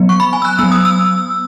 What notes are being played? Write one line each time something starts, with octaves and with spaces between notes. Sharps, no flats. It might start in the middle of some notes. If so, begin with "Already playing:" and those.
Already playing: F#3 B3
C#6
B5
G#5
E6
F#6
F#3 B3 E6
D#6
E6